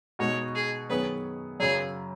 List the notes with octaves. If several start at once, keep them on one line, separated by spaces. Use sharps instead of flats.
B2 G#3 D#4 F#4 C#5 D#5
G#4
F#2 D#3 B3 G#4 B4 C#5
F#2 C#3 F#3 G#4